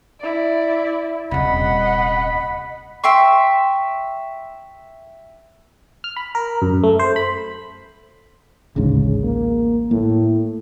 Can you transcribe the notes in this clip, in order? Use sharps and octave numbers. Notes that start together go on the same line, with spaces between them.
E4 D5
D#1 C3 D#5 F#5 B5
E5 G5 C6 C#6
F6
B5
A#4
F#2
A3
C5
B5
A1 D2 G#2 C#3
A#3
A2 A#3